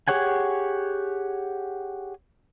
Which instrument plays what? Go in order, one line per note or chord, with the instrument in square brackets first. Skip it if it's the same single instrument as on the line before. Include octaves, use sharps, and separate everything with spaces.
[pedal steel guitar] G4 G#4 C#5 F#5 G#5